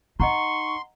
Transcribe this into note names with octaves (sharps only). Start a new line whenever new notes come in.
D#4 D#5 F#5 A#5 C6 C#6